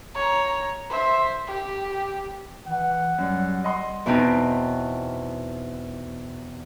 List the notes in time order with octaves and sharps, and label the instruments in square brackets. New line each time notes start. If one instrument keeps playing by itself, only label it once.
[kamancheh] C#5 A#5
C5 E5
G4
[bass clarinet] E3 [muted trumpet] F#5
[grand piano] F#2 [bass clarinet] G3
[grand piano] D#5 F#5 C6
[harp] E2 B2 B3 C4 D#4